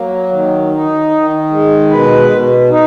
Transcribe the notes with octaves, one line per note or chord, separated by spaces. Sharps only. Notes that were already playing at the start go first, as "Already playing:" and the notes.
Already playing: F#3 A#3
D#3
D#4
D#3
G#3
B2 B4
B2
D#4